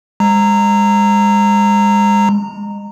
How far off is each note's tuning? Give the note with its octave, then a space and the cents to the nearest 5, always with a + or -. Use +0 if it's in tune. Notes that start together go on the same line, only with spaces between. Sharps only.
G#3 -30 A#5 -15